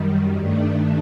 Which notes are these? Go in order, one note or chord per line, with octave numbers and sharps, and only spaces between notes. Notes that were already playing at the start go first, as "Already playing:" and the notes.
Already playing: F#2 D#3 G3
G2 D#3 A3 D4